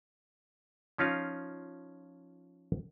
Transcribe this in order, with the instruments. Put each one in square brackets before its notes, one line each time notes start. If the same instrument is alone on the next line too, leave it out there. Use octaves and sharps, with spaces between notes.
[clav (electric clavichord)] F3 C#4 D#4 F4 F5